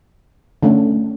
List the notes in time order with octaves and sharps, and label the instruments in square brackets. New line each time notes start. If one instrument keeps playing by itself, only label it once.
[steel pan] D3 A3 C#4